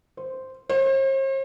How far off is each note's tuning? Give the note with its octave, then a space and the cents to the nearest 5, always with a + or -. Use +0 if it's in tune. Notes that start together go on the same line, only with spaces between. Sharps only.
C5 -5
C5 +45